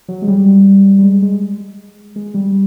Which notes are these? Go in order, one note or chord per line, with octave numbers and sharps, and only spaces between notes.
F#3
G#3
G3
G3
G#3
G#3
G#3
G3